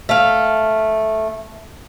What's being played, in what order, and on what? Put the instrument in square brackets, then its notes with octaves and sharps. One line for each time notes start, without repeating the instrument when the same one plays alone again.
[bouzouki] A3 F5